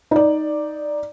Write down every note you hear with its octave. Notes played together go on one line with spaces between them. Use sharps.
D#4 D5